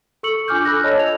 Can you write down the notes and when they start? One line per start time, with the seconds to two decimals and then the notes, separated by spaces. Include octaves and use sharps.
0.23 A4 C#6 E6 C#7 F#7
0.48 D4 F4 G#5 D6 F6 G6
0.65 A4 B5 E6 F#6 A#6
0.84 C#5 D#5 A5
0.98 G#6 F7